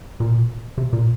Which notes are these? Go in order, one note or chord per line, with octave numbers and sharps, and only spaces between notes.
A#2
C3
A#2